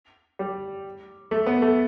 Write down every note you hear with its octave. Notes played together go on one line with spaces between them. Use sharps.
G3
A3
B3
A3